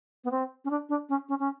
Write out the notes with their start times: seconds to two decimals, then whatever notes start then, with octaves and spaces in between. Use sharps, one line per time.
0.24 B3
0.31 C4
0.65 C#4
0.70 D4
0.89 D4
1.09 C#4
1.29 C#4
1.39 C#4